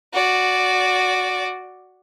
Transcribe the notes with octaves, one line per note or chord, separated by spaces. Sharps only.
F#4 D5